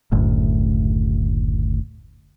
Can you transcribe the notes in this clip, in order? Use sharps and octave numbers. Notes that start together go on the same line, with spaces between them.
F#1 D2 A2